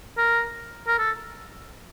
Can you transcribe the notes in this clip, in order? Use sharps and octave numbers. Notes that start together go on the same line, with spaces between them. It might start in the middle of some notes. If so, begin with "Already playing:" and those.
A#4
A#4
A4